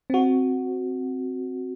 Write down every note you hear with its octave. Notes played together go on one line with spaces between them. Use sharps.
C4 F#4